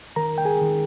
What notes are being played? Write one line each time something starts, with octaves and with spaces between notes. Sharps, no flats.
D#3 A#4 A#5
G5
G#4 G#5
D#3